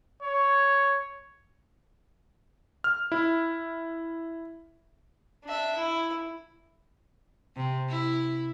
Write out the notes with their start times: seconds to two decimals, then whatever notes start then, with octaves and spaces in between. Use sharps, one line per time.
0.23 C#5
2.84 F6
3.12 E4
5.44 D4 E5
5.77 E4
7.56 C3
7.89 E4